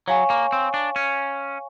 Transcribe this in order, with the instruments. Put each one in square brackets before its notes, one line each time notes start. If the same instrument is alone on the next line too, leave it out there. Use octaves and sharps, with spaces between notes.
[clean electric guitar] F#3 [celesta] C#5 F5 G#5 C#6
[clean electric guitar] A#3
C4
D4
C#4